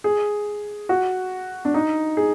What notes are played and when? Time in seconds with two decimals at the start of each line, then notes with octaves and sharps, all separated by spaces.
0.04 G#4
0.89 F#4
1.65 D4
1.74 D#4
2.17 G#4